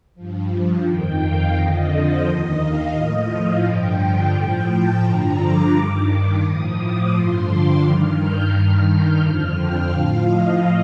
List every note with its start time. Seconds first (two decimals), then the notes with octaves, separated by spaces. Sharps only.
0.15 G2 F3
0.84 F2 D#3 G5
1.19 F5
1.54 F2 D3 F3 D#5
1.89 C5
2.23 D#2 D#3 D#5
2.58 F5
2.93 A2 F3 D#5
3.28 F5
3.63 G2 D3 F3 G5
4.32 A2 F3
4.67 A5
5.02 G2 D3 F3 A#5
5.37 D6
5.71 G2 D#3
6.41 A2 F3 D#6
6.76 D6
7.11 G2 D3 F3 C6
7.46 D6
7.80 G2 D#3 F6
8.15 G6
8.50 G2 D#3 F6
8.85 G6
9.20 F2 D3 F3 F6
9.55 G5
9.89 A2 F3 F5
10.25 D#5